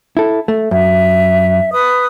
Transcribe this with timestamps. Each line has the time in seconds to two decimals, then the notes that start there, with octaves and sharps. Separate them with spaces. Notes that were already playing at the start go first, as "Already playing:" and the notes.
0.17 E4 A4
0.48 A3
0.71 F#2 E5
1.73 B4 D#6